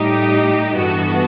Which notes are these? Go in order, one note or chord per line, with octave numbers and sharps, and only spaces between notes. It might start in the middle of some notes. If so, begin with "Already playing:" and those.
Already playing: A2 G3 D#4 G4
G2 E3 B3 F#4 A4